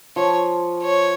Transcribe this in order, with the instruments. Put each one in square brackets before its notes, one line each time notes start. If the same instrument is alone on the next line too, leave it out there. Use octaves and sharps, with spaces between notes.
[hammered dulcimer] F3 [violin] C#5
[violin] C#5